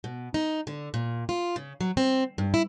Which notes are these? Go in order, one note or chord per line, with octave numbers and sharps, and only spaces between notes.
B2
D#4
D3
A#2
F4
C#3
F#3
C4
G2
E4